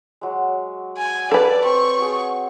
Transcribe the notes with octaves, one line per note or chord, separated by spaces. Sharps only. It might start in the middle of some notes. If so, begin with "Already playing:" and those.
F#3 G#3
G#5
G3 G4 A4 B4 D5 E6
C4 C#5 G#5 C#6
F#4 G#4